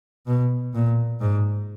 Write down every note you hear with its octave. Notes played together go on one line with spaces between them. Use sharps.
B2
A#2
G#2